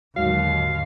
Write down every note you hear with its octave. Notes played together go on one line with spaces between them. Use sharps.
D#2 G#2 D3 F#3 F5